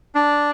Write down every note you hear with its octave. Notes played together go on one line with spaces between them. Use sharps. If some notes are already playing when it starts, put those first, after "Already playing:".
D4